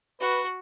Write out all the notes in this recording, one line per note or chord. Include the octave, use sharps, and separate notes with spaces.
F#4 B4